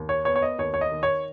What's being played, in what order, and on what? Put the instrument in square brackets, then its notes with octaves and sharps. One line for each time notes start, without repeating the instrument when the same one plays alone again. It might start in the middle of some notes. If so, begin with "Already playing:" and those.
Already playing: [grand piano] D#2
C#5
B3 C#5
C#5
D#5
D#2 C#5
C#5
D#5
D#3
C#5